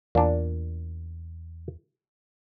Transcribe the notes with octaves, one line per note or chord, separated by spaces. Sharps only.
E2 A#2 D4